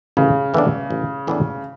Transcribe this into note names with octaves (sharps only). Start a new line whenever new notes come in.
A1 C#3
A2 E3 B3 D4
A1
A2 E3 B3 D4